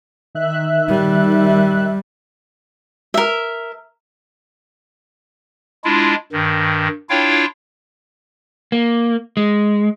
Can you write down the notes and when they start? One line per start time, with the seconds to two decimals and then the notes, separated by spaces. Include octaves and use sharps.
0.35 D#3 E5 F#6
0.89 G3
3.14 A#4 E5
5.84 G#3 D4 E4 F4
6.33 G2 D#3
7.10 D4 E4 F4 C#5 F5 G5
8.72 A#3
9.37 G#3